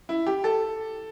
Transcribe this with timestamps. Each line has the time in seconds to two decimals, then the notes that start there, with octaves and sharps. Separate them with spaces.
0.09 E4
0.27 G4
0.44 A4